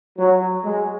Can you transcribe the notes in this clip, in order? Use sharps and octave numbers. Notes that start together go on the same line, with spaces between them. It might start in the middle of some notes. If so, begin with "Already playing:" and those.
F#3
G#3